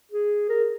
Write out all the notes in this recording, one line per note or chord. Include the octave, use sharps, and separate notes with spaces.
G#4
A#4